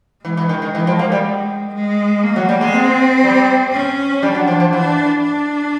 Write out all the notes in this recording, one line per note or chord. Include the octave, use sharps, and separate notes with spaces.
E3 G#3
E3
D#3
D#3
E3
F3
A#3
G3
G#3
A#3
F#3
G3
G#3
C4
G3
C#4
G3 D4
F#3
F3
F3
E3 D4
D4